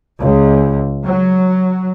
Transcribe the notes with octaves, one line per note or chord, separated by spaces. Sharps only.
C#2
F#3